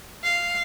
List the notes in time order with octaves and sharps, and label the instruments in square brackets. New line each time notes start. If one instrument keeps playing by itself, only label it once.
[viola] F5